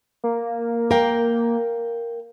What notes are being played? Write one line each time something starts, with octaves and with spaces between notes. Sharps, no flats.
A#3
A#4 F5 G5